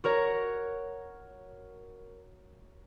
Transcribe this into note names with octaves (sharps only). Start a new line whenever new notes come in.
F#4 A#4 C#5